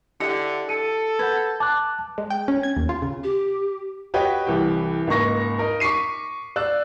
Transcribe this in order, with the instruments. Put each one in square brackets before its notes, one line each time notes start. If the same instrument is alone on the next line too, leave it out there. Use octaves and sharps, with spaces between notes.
[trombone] D3 [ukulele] E4 G4 D#5 [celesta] C#7
[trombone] A4 [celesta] C#7 D#7
[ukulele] B4 [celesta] F#5 G6 G#6
[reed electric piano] A5 F#6 [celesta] D6
[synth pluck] G#3
G5
C#4
G#6
D#2
F4
C#3
[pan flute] G4
[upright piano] F#4 G4 B4 C#5 D#5 G5
C2 E3 G4 G5
C#2 G#2 A#3 C#6 A#6
D#4 A#4
C#6 D6 B6 C7 D#7
D5 E6 F#6